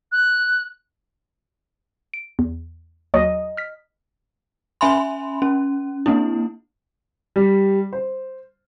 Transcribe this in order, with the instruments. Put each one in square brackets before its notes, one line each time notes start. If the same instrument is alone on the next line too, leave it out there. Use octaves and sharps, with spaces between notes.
[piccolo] F#6
[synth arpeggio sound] D7
E2
[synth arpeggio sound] D#2 F#3 F#4 [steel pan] D#5
[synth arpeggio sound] F6 B6
[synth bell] C#4 E5 G#5 B5 C6
C#4
A#3 C4 D4 E4
[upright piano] G3
C5